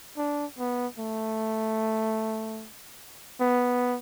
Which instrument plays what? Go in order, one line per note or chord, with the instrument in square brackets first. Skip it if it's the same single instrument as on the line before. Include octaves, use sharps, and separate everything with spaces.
[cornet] D4
B3
A3
B3